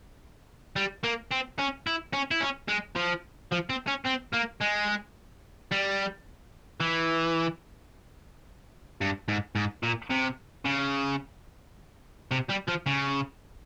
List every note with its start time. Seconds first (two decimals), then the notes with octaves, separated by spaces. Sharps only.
0.76 G3
1.03 A#3
1.31 C4
1.59 C#4
1.87 E4
2.13 C#4
2.31 E4
2.40 C#4
2.68 G#3
2.96 F3
3.52 F3
3.70 C4
3.88 C#4
4.06 C4
4.34 A#3
4.61 G#3
5.71 G3
6.80 E3
9.01 G2
9.28 G#2
9.56 G#2
9.83 A#2
10.10 C3
10.65 C#3
12.31 C3
12.49 G3
12.68 F3
12.86 C#3